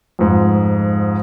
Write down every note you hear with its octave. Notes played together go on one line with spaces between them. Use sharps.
F2 G#2